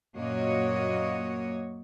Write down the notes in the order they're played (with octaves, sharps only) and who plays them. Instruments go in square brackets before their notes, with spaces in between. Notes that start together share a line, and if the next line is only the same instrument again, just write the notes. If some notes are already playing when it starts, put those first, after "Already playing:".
[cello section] F#2 A#2 A#3 F#4 C#5 D#5